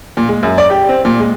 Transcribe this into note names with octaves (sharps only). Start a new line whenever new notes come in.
A#2
G#3
F#2
D5
G4
C4
A#2
G#3